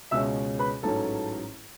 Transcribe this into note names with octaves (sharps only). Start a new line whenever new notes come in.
C#2 B2 G#3 C#4 E5 E6
B4 B5
A1 G#2 F#3 C#4 A4 A5